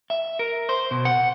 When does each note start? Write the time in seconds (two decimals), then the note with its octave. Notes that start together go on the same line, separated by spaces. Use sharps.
0.10 E5
0.39 A#4
0.69 C5
0.91 B2
1.05 F#5